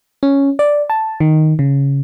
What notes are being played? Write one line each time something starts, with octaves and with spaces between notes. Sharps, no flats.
C#4
D5
A5
D#3
C#3